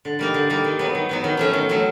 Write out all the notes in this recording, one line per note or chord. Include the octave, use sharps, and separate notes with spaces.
D3
G3 A#3 D#4
D3
G3 A#3 D#4
D#3
F#3 B3 D#4
D#3
F#3 B3 D#4
D#3
F#3 A3 C#4
D#3
F#3 A3 C#4